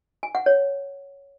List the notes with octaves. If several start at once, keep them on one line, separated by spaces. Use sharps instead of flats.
G#5
F#5
C#5